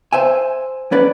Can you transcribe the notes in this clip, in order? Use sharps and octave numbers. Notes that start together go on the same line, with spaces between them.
C5 E5 G#5
C#4 B4 D5